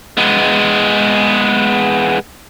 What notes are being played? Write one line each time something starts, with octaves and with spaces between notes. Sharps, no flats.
G#3 B3